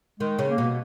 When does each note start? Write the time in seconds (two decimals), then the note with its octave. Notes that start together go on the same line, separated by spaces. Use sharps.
0.20 D#3 G#3
0.39 C#3
0.49 A#3
0.58 B2